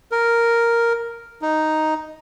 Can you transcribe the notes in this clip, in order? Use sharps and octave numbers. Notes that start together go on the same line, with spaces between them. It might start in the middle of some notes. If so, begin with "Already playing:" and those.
A#4
D#4